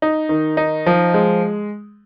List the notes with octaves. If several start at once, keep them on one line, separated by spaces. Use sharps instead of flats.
D#4
D#3
D#4
F3
G#3